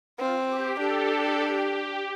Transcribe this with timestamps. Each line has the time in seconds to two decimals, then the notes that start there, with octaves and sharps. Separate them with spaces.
0.19 C4 F4
0.49 G4
0.80 D4 A4
1.41 G4